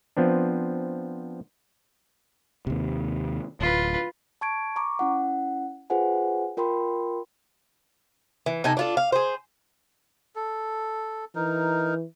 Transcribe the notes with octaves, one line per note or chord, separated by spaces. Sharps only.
F3 B3 C4 D4
D#2 C3
D1 F4 B4
A5 C#6 G#6 D7
A#5 C#6 D6
C#4 E4 F#5
F4 G#4 B4 C5 F#5 G#5
F4 A#4 G5 B5 C6
E3
C3 D#4 A4 G#5
D4 F4 A4
F5
G#4 C5
A4
E3 D#4 A#4